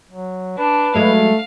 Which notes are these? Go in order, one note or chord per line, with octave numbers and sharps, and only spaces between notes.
F#3
D4 B4
F#3 G#3 A3 F5